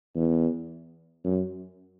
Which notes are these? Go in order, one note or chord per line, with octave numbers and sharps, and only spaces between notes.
E2
F#2